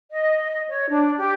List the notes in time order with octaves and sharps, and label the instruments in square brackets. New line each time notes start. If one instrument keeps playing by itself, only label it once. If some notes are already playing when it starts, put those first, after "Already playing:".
[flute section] D#5
C#5
D4
G4